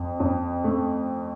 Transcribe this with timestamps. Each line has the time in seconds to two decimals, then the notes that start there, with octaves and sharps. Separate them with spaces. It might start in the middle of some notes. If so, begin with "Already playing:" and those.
Already playing: F2
0.20 F2
0.64 A3